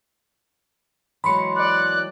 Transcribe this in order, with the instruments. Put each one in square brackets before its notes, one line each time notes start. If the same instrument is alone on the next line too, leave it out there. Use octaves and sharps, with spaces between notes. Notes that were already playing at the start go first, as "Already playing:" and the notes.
[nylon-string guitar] E3 F#3 G#3 [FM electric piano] B5 C6 C#7
[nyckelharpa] D5 [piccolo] F#6